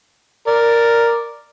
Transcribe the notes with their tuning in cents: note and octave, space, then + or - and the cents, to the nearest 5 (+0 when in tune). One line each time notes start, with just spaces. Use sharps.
A#4 +0 D5 +0